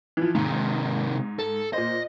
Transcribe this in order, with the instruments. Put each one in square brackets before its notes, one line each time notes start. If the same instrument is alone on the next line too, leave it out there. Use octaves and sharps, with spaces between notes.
[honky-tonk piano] E3 F3
[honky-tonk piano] G#2 [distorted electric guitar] C3 D#3
[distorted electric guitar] A4
[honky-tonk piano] A#2 C5 [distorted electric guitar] D#5